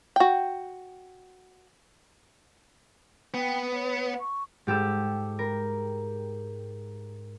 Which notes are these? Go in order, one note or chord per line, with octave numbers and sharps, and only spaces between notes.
F#4 G5
B3 G5
C#5
C#6
G#2 G4 A4 E6
A#4